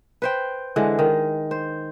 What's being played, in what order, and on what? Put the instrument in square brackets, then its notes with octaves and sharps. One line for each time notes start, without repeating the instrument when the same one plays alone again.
[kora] B4 C5 G5
D3 E3 G#3
D#3
C5